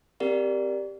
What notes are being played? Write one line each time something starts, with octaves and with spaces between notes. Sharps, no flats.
C4 G4 A#4 D5 F5